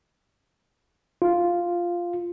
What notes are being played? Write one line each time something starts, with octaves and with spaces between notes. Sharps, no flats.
F4